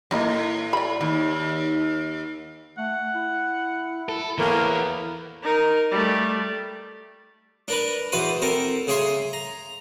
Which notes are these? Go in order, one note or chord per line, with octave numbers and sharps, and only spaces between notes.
F#2 A2 E3 A#3 D#5
D5 B5
D#2
A3 F#5
E4
A4
A2 E3 A#3 B3 A#4
D#4 A#4
G3 A3
D4 A#4 B4
E2 B2 B4 C5 D#6
C4 A4 A#4
C#3 G#4 C#5 E5 C6
A#5